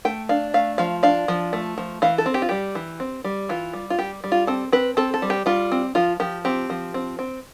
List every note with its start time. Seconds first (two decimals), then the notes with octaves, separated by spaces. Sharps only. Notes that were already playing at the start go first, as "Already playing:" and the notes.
0.05 A3 G5
0.29 D4 F5
0.54 A3 F5
0.78 F3 F5
1.03 D4 F5
1.28 F3
1.53 A3
1.78 F3
2.02 E3 F5
2.18 A4
2.26 C4
2.34 G4
2.42 F4
2.49 G3 G4
2.75 E3
3.00 C4
3.24 G3
3.49 E3 F4
3.73 G3
3.90 F4
3.99 G3 G4
4.24 G3
4.32 F4
4.47 C4 A4
4.72 C4 B4
4.97 C4 A4
5.14 A4
5.22 G3
5.30 G4
5.46 G3 F4
5.72 C4
5.95 F3 F4
6.20 F3 G4
6.45 C4 G4
6.70 F3
6.94 C4
7.19 C4